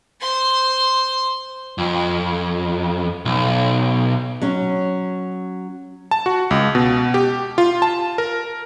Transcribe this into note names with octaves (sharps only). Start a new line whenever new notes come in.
C5 C6
F2
B1
F#3 C#4
A5
F#4
C#2
B2
G4
F4
A5
A#4